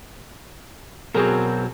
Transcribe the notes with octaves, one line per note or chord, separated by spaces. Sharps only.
B2 F#3 C4 F#4 G#4 A#4